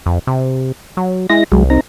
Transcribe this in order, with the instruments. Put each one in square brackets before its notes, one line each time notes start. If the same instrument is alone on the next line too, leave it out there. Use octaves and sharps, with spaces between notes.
[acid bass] F2
C3
F#3
[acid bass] G#3 [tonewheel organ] E4 A#6
[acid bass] C2 [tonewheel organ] F#3 G#3
[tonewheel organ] C4 D#4 A#5